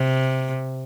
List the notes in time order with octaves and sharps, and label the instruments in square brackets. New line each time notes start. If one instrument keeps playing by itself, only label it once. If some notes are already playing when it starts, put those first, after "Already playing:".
Already playing: [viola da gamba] C3